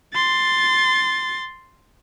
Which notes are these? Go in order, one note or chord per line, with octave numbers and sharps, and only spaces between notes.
C6 A6